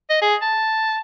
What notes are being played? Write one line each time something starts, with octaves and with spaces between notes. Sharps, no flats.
D#5
G#4
A5